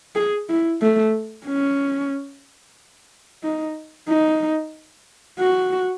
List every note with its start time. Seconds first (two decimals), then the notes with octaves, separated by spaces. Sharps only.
0.15 G#4
0.49 E4
0.82 A3
1.46 C#4
3.43 D#4
4.08 D#4
5.39 F#4